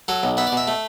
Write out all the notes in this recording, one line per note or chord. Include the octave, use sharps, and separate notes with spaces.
F#3 A4
B1
B3 E5
D5
B2 E5
A3